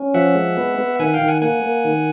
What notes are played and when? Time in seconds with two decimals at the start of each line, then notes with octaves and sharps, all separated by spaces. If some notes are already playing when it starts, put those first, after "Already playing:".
Already playing: C#4
0.14 F3 E5 F#5
0.35 G#3
0.57 B3
0.78 B3
0.99 D#3 F#5 G#5
1.14 F5 G5
1.21 D#3
1.28 F#5 G#5
1.42 A#3 F#5 G#5
1.64 A#3
1.85 D#3